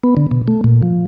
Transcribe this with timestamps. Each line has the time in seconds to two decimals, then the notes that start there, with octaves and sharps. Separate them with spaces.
0.04 B3
0.17 D3
0.31 B2
0.48 A3
0.64 A#2
0.83 F3